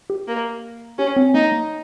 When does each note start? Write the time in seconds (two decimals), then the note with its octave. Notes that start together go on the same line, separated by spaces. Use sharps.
0.10 G4
0.28 A#3
0.98 C#4 G4
1.16 C4
1.34 A#3 D#4
1.52 A#3